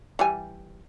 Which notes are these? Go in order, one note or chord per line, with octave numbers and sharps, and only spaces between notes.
E3 G3 G#5